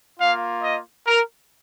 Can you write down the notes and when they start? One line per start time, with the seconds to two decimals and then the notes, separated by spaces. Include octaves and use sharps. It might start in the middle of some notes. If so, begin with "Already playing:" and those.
0.20 A#3 F4 F5
0.63 D#5
1.07 A#4